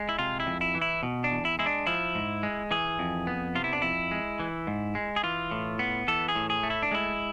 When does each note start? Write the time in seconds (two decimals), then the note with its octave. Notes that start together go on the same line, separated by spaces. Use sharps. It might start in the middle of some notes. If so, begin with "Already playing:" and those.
Already playing: G#3
0.09 E4
0.19 C3 F4
0.40 E4
0.47 F2
0.61 E4
0.75 E3
0.82 E4
1.03 B2
1.24 D4
1.31 E2
1.45 E4
1.59 G#3 E4
1.66 D4
1.87 F3 E4
2.15 G#2
2.43 G#3
2.71 E3 G#4
2.99 F2
3.27 B3
3.55 C3 F4
3.64 E4
3.73 D4
3.82 F2 E4
4.11 G#3
4.40 E3
4.67 G#2
4.95 G#3
5.16 G#4
5.23 E3 F4
5.51 A2
5.79 B3
6.08 E3 A4
6.29 G#4
6.35 A2
6.50 G#4
6.63 A3
6.70 E4
6.83 D4
6.91 G#3 E4